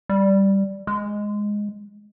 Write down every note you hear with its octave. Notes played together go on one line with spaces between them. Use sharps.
G3
G#3